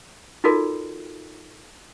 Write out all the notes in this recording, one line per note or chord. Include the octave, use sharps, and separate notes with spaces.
D#4 F4 F#4 A4 A#4 D5